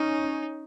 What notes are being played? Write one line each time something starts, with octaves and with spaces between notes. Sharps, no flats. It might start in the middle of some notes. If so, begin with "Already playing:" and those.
Already playing: C#4 D#4